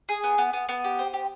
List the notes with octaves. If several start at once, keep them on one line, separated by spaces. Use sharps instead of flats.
G#4
B3
B3
B3
B3
G4
C5
G4